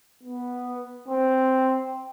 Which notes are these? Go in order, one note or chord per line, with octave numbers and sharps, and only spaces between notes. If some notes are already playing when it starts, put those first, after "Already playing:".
B3
C4